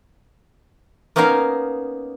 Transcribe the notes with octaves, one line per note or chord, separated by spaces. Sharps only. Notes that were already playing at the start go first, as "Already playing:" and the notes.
A#3 B3 C#4 D#4 A#4 F5